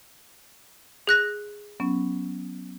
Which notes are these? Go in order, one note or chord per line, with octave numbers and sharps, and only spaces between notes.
G#4 F#6 A#6
F#3 B3 C#4